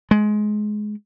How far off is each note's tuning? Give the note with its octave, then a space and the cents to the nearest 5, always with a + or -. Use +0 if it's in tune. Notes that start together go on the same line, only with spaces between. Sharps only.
G#3 +20